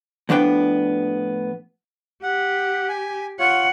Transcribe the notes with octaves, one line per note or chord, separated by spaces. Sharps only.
A2 F3 B3 D4 B4 G5
G4 F#5
G#5
F4 C#5 F#5